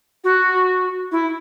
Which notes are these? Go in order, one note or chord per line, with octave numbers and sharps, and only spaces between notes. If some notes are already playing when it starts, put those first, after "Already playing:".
F#4
E4